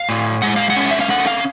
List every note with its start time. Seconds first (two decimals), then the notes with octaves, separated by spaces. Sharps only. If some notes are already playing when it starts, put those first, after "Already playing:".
Already playing: F5
0.09 A2
0.42 G#3 F#5
0.56 F5
0.70 F#5
0.76 C#4
0.91 E5
1.01 F5
1.09 A3 F#5
1.27 F5